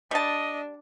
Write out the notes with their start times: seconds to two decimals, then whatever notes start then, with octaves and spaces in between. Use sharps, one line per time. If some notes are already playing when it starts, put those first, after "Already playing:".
0.11 G3 D4 D#5 A5